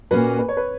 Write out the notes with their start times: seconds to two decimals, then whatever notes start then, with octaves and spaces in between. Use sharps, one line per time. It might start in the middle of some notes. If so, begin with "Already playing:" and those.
0.11 A#2 A#3 C#4 F#4 B4
0.39 B4
0.48 C#5
0.57 B4